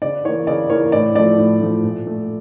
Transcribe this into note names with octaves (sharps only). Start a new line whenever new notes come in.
C#3 D5
E3 A#3 C#5
C#3 D5
E3 A#3 C#5
A2 D5
F3 A3 D5
A2
F3 A3
A#2
A3